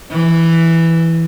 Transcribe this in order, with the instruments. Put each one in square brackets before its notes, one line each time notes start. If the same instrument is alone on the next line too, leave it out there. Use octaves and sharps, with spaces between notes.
[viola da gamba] E3